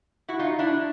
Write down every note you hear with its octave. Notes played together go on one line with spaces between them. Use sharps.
E4 F#4
D#4 F4
D4 E4